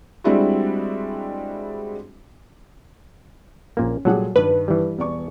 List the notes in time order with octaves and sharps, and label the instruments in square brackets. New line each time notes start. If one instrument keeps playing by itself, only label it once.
[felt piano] G3 G#3 C4 D4 E4 F#4
[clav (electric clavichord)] A#1 A#2 A#3 [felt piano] C#4
[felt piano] A#2 G3 G#4 [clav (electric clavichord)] F#3 A4 F#5
[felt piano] G2 D#3 [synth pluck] B4
[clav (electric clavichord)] E3 G3
[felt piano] E1 D5 C#6